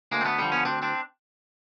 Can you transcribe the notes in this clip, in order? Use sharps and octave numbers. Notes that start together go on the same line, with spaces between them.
D2 G#3 A#3
C4
A3 B3
D3 F3 G3
B3 C#4
D2 C4 D4
C4 D4